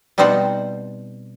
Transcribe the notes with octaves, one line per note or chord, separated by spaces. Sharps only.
B2 G3 C4 D#4 C5 F#5